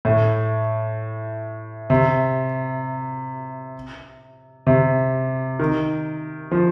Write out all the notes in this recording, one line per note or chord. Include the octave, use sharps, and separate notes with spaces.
A2
C3
C3
D#3
F3